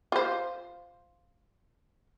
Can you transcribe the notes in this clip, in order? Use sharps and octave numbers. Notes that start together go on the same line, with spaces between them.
F4 C5